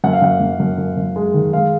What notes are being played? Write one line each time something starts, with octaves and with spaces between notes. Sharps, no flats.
F#2 F#5
F5
F#2 F#5
F#2
F#2
F#2
F#2
G#3
D#3
G#3 F5